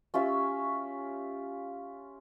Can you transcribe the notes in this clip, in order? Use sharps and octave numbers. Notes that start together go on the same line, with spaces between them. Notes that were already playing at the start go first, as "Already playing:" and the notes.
C#4 F4 G4 E5